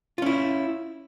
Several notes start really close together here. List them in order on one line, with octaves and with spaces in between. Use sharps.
F4 C#4 E4